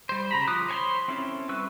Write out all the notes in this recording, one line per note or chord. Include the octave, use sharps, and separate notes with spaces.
G3 C5
C#3 A#5 B5
F3 F4 D6 D#6 F#6
C5 C#5 G#5 B5 C6
C4 C#4 E4 A4
G3 B4 C#6 E6 F#6